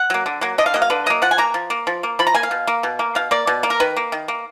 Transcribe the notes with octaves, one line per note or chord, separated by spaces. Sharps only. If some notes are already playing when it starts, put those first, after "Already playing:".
Already playing: F#5
F#3 A#3
D3
F#3 A#3
D3 D#5
F5
F#3 A#3 D#5
F5
D3 B4
F#3 A#3 D#5
F3 F#5
G#5
A#3 A#5
F3
A#3
F3
A#3
F3 B5
A#5
A#3 G#5
F5
B2
A#3
B2
A#3
B2 F5
A#3 D5
B2
A#3
A#4
D#3 B4
A#3
D#3
A#3